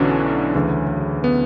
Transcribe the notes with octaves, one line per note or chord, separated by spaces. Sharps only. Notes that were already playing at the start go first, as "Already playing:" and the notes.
Already playing: B1 B2 D3 E3 F#3 C#4 D4 F#4
D2 C#3 E3
B3